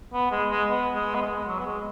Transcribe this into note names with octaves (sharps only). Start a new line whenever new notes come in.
B3
G#3
G#3
B3
G#3
B3
G#3
F#3
B3
G#3